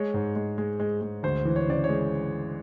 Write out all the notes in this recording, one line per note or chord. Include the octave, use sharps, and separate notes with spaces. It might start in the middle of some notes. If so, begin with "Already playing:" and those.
Already playing: G#3 C#5
G#2
G#3
G#3
G#3
G#3
D2 C5
E3
C#5
C#3 D5
C#5
G#3